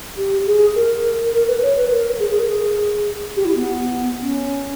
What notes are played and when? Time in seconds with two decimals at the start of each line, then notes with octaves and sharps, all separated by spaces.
0.17 G4
0.46 G#4
0.76 A#4
1.34 A#4
1.48 B4
1.62 C#5
1.76 B4
1.91 A#4
2.20 G#4
2.30 G#4
2.39 A#4
2.49 G#4
3.36 G4
3.45 E4
3.56 B3
4.22 C#4